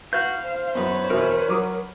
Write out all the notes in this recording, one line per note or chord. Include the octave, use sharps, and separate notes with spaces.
F#4 B4 F5 G6
C5
F#2 B3 B4 C#5
E2 B2 A#4
F#3 D6 D#6